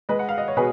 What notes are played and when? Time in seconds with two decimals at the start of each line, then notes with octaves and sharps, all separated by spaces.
0.09 G#3 B4 D#5
0.19 F#5
0.29 F5
0.38 D#5
0.48 C#5
0.57 B2 G#4 B4